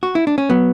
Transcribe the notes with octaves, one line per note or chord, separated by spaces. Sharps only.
F#4
E4
D4
C#4
F#3 B3